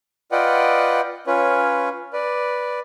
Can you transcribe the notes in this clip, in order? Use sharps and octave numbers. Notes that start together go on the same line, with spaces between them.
F4 B4 D5 D#5 F#5 G5
C#4 F4 B4 C#5
B4 D5